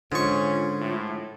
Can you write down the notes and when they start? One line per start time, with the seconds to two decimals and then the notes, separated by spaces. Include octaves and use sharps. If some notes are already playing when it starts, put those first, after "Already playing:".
0.12 G#2 D3 C#4 F4 C#6
0.81 A2